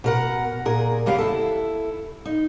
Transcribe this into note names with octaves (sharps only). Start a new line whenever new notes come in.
B2 A#4 F#5
A#2 G#4 A#4
E2 C#3 B3 G4 F5
E4 A4
D#4